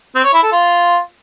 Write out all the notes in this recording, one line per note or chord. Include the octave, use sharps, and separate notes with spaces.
C4
C#5
E4
A4
F4